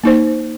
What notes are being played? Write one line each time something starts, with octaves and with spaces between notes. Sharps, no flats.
A#3 D#4 C5